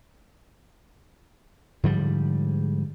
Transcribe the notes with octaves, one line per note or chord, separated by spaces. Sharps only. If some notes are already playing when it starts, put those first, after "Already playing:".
G#2 D3 F3 G3